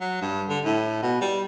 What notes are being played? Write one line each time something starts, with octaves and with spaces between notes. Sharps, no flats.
F#3
G2
D3
A2
B2
G3